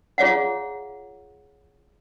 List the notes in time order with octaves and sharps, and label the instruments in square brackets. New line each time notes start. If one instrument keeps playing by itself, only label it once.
[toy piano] F4 G#4 C#5 F5 F#5